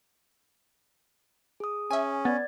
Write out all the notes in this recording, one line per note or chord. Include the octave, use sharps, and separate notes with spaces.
G#4 D#6
C#4 E5 G#5
B3 D5 G#6 A6